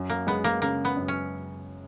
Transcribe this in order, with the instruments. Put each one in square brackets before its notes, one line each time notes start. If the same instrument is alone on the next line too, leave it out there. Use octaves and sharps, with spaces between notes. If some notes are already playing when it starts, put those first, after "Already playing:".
Already playing: [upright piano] F#2
[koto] A#3
[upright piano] G#3 [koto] B3
[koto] A#3
[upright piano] C#3 [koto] A#3
[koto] B3
[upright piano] F#2
[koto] C#4